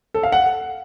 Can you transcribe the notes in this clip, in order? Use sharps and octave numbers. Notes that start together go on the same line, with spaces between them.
A4
F5
F#5